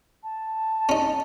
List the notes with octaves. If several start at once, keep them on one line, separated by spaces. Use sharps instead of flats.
A5
C#4 D#4